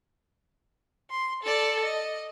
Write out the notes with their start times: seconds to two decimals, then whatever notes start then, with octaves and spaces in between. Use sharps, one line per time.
1.10 C6
1.43 A4 D5
1.84 D#5